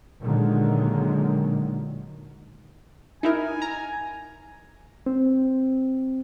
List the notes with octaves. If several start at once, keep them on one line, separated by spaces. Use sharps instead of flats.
A#2 D3 D#3 F#3 G#3
D#4 E4 A#4 G#5
A#5
C4